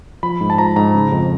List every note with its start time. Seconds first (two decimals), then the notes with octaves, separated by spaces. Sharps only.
0.23 F3 B5
0.41 G#2
0.50 A5
0.58 F3 A#5
0.76 G#2 A#5
0.94 C#3
1.12 F2